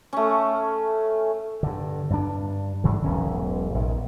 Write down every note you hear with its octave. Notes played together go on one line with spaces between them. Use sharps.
A3 C#4
G2 D3
G2 D4
G#2 D3 E3
E1 B1 E3 C#4
A#1 G#2